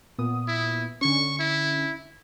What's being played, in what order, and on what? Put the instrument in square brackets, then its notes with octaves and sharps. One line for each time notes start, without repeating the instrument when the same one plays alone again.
[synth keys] A#2 B3 D#6
[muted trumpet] E4
[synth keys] D3 C#4 [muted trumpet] C#6
[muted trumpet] E4